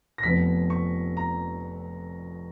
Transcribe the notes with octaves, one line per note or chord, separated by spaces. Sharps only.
A#6
F1 F2 F3 B3 B6
C#6
A#5